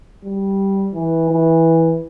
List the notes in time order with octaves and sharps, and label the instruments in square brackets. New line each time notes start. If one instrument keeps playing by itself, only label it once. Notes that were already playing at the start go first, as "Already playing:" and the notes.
[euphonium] G3
E3
E3